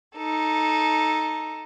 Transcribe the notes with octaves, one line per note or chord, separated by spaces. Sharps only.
D#4 A4